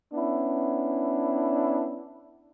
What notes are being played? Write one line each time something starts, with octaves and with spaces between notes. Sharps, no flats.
B3 C#4 D4 E4